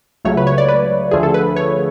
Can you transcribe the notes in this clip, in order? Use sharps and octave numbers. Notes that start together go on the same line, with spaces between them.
C#2 C#3 F#3 A3 C#5
B4
C#5
D5
B4
D2 D3 F3 A3 G#4
A4
B4
C#5